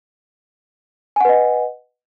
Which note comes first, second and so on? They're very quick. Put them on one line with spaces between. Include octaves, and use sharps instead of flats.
G#5 F#5 B4 D#5